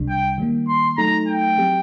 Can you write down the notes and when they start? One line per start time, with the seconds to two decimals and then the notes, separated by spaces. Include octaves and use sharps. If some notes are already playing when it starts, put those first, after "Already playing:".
Already playing: C2 C3 G3 D4
0.09 G5
0.38 D#3 G3 A#3
0.68 C6
0.98 F#3 A3 D#4 A4 A#5
1.28 G5
1.58 F#3 C4 G4